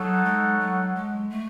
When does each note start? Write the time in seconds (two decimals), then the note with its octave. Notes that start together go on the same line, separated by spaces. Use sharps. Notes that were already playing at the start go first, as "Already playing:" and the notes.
Already playing: F#3 D#4 A4 C#5 F#5
0.25 G#3
0.60 F#3
0.95 G#3
1.30 A3